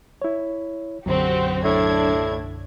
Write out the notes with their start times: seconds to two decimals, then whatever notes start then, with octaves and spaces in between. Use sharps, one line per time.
0.22 E4 C#5
1.06 B1 F#2 D3 F#3 C4 F#4 G4
1.65 A2 D4 G#6